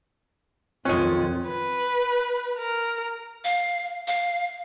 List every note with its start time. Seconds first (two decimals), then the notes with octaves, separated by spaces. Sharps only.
0.85 B1 F2 D#3 G#3 C4 C#4 F4
1.47 B4
2.59 A#4
3.44 F5
4.08 F5